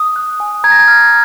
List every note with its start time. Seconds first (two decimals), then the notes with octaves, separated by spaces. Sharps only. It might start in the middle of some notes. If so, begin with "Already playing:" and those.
Already playing: D#6
0.16 F#6
0.40 G#5
0.64 A#5 G#6
0.72 A#6
0.79 G#6
0.88 F6